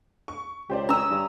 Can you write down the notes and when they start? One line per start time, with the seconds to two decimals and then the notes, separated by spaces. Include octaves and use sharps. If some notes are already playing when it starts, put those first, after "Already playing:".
0.28 C#6
0.70 C#2 G4 C5 D5
0.89 C#4 A#5 D#6 E6
1.10 G2